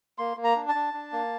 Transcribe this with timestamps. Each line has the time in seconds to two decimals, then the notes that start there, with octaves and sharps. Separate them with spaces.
0.18 A#3 C6
0.37 A#3
0.44 A#5
0.56 D4
0.68 A5
0.75 D4
0.94 D4
1.12 A#3